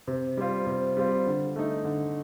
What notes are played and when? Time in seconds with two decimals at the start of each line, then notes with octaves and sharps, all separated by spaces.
0.07 C3
0.37 G3 C4 F4
0.66 C3
0.97 G3 C4 F4
1.27 D3
1.56 A3 D#4
1.85 D3